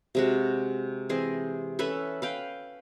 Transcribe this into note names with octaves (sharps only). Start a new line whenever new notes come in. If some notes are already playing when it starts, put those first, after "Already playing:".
C3 G#3 F#4
E3 C4 G#4 D#5
C#4 A4 B4 E5
B4 F5 G5